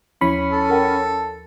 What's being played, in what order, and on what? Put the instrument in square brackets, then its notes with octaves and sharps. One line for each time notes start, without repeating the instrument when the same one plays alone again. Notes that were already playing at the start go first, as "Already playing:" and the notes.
[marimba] D#2 F3 E4 [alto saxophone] C#4 [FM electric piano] B5
[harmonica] A4
[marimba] A#4 F#5 G5